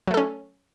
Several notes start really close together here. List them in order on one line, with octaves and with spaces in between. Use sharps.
F#3 A3 A4 C#4